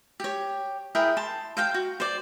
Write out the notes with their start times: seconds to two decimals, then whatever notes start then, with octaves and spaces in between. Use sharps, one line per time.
0.20 G4 C#5
0.95 E4 G#4 A#4 G5
1.17 A5 C6
1.57 C5 F5 G5
1.74 F#4
2.00 C5 D5